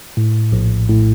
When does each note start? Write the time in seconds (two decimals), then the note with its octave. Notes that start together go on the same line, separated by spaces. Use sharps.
0.17 A2
0.52 A#1
0.89 A2